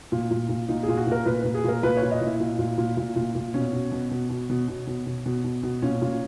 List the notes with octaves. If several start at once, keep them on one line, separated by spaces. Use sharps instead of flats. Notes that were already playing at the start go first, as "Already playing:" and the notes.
A#2
A#2
A#2
A#2 D#4
G#4
A#2
F#4
A#2 A#4
A#2 B4
A#2 B4
G#4
A#2 A#4
A#2 B4
C#5
A#2
D#5
A#2 E4
A#2
A#2
A#2
A#2
A#2
A#2
B2 C#4
B2
B2
B2
B2
B2
B2
B2
B2
B2
B2
B2
A#2 C#4
A#2